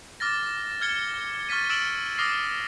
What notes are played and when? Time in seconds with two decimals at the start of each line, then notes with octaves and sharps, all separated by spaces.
0.20 D6 F6 A6 A#6
0.81 F6 G#6 C#7 G7
1.49 C#6 F6 A6 B6 D#7
1.70 E6 F6 A6 D7 E7 F#7
2.18 D6 D#6 F6 A#6 C7